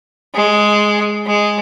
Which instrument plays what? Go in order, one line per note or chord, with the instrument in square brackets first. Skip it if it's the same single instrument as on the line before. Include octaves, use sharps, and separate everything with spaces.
[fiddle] G#3
G#3